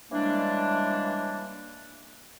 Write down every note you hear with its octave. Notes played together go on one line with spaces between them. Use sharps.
C#3 E3 G3 G#3 A#3 D4